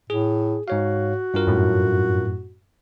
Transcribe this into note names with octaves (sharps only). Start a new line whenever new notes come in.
A2 G#4
G#2 F#4 C#5 F5
G2 F4 A#4
F#2 A2